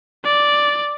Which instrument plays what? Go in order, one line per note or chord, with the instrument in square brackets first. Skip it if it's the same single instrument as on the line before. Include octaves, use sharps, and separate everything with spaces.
[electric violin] D5